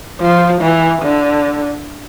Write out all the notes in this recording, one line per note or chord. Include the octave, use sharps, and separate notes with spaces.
F3
E3
D3